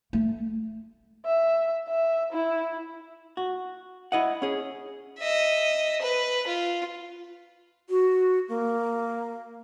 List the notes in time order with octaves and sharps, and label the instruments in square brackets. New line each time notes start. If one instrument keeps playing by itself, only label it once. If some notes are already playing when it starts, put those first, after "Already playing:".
[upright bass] A3
[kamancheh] E5
E5
E4
[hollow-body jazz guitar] F#4
E4 D#5 F#5
C#4 G#4
[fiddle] D#5 E5
B4
F4
[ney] F#4
A#3